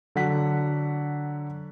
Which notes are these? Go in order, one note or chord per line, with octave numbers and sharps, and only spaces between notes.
D3 F#3 F#5 B6